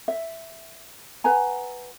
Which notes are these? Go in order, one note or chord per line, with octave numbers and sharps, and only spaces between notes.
E5
B4 F#5 G#5 A#5